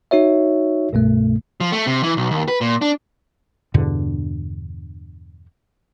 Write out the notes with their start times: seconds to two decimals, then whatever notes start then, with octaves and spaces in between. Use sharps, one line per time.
0.11 D#4 F#4 C#5 E5
0.93 C2 G2 B2 A3
1.60 F3
1.72 A3
1.87 C3
2.03 E3
2.17 B1
2.31 D#2
2.48 B4
2.61 A#2
2.82 D4
3.74 E2 G2 B2 D3